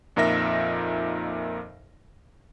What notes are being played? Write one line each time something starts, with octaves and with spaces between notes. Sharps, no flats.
F2 A#2 D#4 A#4 E5 A#6